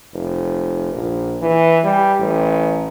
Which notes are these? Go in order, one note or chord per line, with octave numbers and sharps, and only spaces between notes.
F1
A#1
E3
G3
A1